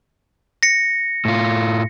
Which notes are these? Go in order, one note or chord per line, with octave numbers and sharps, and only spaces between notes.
A#6 C#7
A2 F4